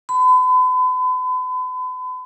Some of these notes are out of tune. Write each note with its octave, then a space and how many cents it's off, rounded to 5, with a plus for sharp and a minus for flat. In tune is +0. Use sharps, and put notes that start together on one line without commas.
B5 +40